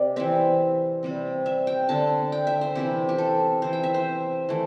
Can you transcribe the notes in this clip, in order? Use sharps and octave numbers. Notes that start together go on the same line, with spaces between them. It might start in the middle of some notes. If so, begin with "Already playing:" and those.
Already playing: C3 D5
E3 C4 E5
C3 G3 C4
E5
G5
D3 C4 A5
G5
E5
C5
C3 E3 C4 G4
G4
A4
E3 C4 C5
G5
E5
C5
E3 A3